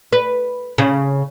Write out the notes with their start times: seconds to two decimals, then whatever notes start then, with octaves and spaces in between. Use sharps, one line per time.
0.13 B4
0.78 C#3